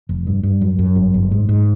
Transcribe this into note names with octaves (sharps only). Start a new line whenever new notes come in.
F1
G2
G2
F#2
F#2
G1
G1
G#2
G#2